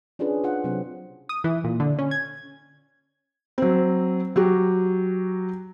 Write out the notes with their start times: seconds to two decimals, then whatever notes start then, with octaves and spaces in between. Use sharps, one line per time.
0.19 C#4 D4 F4 G#4 B4
0.44 F4 F#5
0.64 C3 F#3 C4
1.29 D#6
1.44 E3
1.64 A#2
1.80 D3
1.99 C#4
2.11 G#6
3.58 F#3 C4
4.36 F#3 F#4 G4